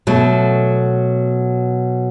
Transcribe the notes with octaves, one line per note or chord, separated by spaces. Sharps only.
B2 F#3 A3